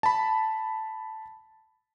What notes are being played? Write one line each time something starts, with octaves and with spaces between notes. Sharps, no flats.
A5 B5